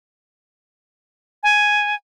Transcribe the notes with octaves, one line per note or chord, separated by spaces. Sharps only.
G#5